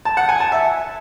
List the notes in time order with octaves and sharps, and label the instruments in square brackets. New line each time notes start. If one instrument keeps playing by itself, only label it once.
[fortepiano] A5
F#5
G#5
A5
E5